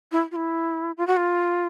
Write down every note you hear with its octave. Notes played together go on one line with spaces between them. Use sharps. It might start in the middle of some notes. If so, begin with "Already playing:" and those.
E4
F4
E4
F4
F#4
F4